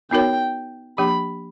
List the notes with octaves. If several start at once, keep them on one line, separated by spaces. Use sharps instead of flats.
B3 D#4 F#4 A#4 C#5 G5
F3 A#3 D4 G4 B5